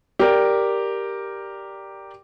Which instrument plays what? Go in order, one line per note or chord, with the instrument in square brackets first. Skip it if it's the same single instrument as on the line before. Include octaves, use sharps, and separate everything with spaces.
[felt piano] G4 A#4 D5